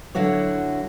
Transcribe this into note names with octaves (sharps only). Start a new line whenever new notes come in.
D3 F#3 E4 F#4 C#5